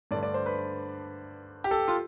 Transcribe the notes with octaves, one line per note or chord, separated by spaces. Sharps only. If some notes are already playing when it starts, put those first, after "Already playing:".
G2 D3 A3 D5
D5
C5
B4
G4
A4
F4